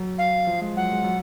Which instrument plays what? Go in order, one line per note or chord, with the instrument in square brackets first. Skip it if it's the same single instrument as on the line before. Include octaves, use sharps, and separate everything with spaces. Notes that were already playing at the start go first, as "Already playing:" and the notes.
Already playing: [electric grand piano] F#3
[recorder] F5
[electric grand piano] F3
G#3
[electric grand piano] F#3 [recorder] F#5
[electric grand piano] G#3
F#3